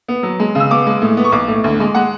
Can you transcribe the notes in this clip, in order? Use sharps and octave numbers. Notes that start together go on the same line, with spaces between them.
B3
F#3
G#3
C#3
E6
B3 D6
G#3
A2
B3
C#6
B1 D6
A2
D2
G#3
G#3 F#5